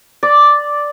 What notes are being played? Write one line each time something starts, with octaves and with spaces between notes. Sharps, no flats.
D5